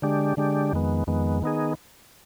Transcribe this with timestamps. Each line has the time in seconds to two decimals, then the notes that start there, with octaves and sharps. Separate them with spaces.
0.02 D3 G#3 D4 G4
0.37 D3 G#3 D4 G4
0.73 F2 D#3 G#3 B3
1.07 F2 D#3 G#3 B3
1.42 D#3 B3 D#4 G#4